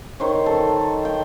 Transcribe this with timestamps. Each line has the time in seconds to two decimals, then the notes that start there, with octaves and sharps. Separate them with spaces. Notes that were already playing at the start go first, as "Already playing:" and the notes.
0.20 D#3 C5 C#5
0.46 A4
1.05 G5